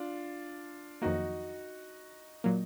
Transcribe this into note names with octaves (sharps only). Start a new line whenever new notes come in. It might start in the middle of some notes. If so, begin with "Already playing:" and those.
Already playing: D4 F4
F2 D#3 F#3 A#3 D#4 F#4
A#2 F#3 A#3